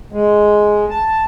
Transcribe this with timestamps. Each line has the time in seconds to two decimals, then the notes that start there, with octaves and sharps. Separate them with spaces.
0.12 G#3
0.90 A5